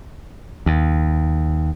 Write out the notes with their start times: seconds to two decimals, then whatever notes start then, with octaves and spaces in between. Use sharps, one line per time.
0.66 D#2